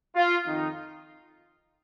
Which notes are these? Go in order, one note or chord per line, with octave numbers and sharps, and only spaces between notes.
F4
F2 D#3 D#4